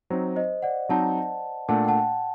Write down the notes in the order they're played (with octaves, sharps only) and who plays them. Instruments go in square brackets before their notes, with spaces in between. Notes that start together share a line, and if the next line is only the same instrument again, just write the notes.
[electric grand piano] F#3 C4 D#4 [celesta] C5
[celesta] C5 D#5
D5 F#5
[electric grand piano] F#3 C4 D#4 [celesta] F#5 A5
[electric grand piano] A#2 A3 D4 [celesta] F#5 A5
[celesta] G5
F#5 A5